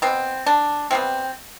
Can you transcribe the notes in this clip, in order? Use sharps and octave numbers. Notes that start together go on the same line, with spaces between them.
B2 B3 C4
D4
C3 G3 B3 C4